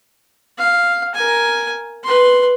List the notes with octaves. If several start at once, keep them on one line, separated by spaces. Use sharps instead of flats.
F5
A#4 G#5
B4 C6